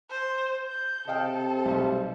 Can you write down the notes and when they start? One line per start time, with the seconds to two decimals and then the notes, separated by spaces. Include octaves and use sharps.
0.10 C5
0.68 G6
1.08 C3 A4 D#5 F5 G5
1.65 B1 G3 C5